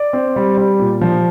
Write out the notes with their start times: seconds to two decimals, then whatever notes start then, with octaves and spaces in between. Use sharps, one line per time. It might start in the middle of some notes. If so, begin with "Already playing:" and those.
Already playing: D5
0.13 C4
0.36 G3
0.58 G3
0.80 A#2
1.01 F3